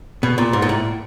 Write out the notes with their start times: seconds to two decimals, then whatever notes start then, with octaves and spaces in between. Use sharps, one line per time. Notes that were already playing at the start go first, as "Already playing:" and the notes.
0.23 B2
0.38 A#2
0.53 G#2
0.62 A#2
0.69 A2